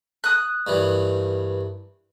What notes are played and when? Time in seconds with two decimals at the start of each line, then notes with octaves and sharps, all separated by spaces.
0.24 D#6 F#6
0.67 G2 D#3 E3